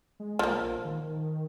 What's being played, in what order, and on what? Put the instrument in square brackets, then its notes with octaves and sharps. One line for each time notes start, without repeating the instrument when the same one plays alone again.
[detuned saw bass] G#3
[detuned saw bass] B1 [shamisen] F3 A#3
[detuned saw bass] A#1
D#3